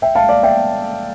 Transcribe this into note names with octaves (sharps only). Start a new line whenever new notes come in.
E5 G5
F5 A5
D5 F5
E5 G5